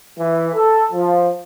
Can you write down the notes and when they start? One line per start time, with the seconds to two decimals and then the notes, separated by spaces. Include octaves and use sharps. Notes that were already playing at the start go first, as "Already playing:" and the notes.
0.17 E3
0.53 A4
0.92 F3